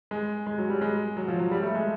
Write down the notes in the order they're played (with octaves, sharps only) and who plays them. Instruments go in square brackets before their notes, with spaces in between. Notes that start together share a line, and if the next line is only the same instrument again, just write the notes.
[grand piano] G#3
G#3
F#3
G3
G#3
F#3
F3
F#3
G3
A3
G#3